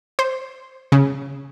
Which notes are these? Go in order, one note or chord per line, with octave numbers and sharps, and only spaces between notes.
C5
C#3